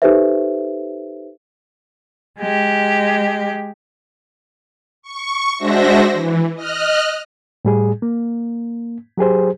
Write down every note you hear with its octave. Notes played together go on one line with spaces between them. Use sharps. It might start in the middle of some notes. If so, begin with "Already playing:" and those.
D#4 G4 A4 B4 C5 E5
G#3 G4
C#6
G#3 D4 F#4 C5 E5 A#6
E3
D#5 F6 F#6
A2 G3 G#4
A#3
F#3 G4 G#4 C5